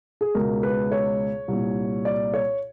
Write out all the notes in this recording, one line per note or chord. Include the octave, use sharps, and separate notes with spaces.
G#4
C#2 B2 A#4
B4
C#5
C2 A#2
D5
C#5